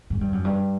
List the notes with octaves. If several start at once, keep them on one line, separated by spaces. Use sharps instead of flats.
G#2
G2
F#2
G2